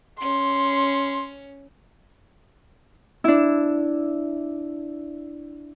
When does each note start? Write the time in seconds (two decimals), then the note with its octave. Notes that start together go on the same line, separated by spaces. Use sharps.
0.21 C#4 C6
3.24 D4 E4